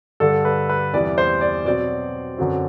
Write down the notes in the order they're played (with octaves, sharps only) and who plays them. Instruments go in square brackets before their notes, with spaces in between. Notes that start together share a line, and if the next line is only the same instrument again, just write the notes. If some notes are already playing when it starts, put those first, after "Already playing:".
[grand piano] G2 D3 G3 A4
B4
B4
E2 C3 E3 G3 B3 D5
C5
D5
B2 F#3 C4 D5
F#2 D3 F#3 C4